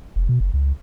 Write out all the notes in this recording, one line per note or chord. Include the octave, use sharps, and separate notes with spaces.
F1
B2
F#1
C#2